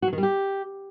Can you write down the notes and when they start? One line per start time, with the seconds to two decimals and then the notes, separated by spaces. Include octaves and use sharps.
0.02 F#4
0.08 F#3
0.13 D#3
0.18 G3
0.23 G4